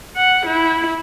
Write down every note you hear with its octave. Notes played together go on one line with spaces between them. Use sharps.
F#5
E4